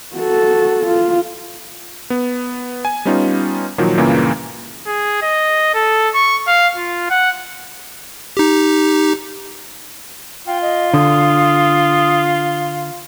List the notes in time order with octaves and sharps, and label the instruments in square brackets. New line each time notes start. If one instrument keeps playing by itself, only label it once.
[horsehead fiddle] F#4 A4
F4
[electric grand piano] B3
G#5
G3 B3 C#4 D#4 F4
A#2 D#3 F3 F#3
C#2 G2 A#2 C#3 E3 A#3
[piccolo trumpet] G#4
D#5
A4
C#6
F5
F4
F#5
[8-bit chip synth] D#4 G4
[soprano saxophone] F4 [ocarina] G5
[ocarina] D#5
[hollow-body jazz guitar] D3 [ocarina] D#6